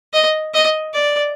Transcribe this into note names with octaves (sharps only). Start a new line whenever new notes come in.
D#5
D#5
D5